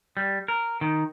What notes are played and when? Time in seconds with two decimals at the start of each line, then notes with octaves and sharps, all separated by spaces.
0.17 G3
0.48 A#4
0.81 D#3